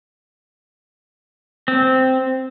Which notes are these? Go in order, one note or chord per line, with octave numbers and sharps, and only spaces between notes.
C4